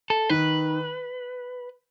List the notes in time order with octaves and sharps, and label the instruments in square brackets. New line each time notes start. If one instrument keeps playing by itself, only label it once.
[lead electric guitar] A4
[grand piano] D#3 [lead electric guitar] B4